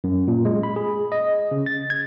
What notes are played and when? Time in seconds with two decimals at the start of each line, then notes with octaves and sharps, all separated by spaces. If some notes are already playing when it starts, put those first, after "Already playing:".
0.04 F#2
0.28 A#2
0.45 G#3
0.63 B5
0.76 G#4
1.12 D#5
1.51 C#3
1.66 A6
1.90 G#6